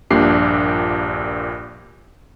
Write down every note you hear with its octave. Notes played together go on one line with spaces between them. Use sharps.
A#1 G2 A#2 D4 G4 C7